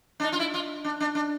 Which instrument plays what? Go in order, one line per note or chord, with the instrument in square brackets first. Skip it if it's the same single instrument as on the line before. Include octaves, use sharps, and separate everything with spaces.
[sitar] D4
D#4
F4
E4
F4
D4
D4
D4